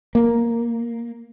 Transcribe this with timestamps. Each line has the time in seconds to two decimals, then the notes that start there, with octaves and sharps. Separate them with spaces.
0.15 A#3